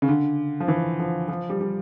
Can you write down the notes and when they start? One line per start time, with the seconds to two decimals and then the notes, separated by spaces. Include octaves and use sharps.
0.02 C#3
0.08 D3
0.60 F3
0.68 E3
0.99 F3
1.28 F3
1.50 G3
1.61 G3